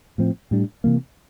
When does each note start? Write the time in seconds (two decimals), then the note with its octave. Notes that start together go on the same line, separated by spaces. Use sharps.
0.18 A2 F3 C4
0.51 A2 G3 D4
0.84 C3 E3 A#3